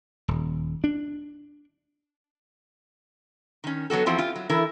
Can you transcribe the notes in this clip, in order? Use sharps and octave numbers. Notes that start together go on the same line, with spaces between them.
D#1
D4
D#3 C#4
F#3 B3 F#4 A4
E2 F3 C4 E4 F#4
F4 G4
F#3
E3 E4 A4 A#4